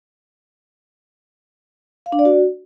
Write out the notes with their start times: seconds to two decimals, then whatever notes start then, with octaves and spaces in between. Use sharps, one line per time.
2.06 F5
2.12 D4
2.19 D5
2.25 F#4